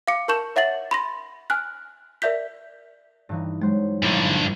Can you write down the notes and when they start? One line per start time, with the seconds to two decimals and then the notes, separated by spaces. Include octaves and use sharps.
0.08 F5 D6 C#7
0.28 A#4 A5 C#6 G6 E7
0.56 C#5 E5 F#5 A6 F#7
0.91 B5 C6 A#6
1.50 G#5 F6 F#6
2.22 A#4 D5 E5 G6 B6
3.29 G2 E3 D#4
3.62 F#3 G#3 C5
4.03 A#1 G2 D3 E4 C7